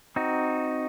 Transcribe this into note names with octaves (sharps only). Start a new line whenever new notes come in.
C4 D#4 F#4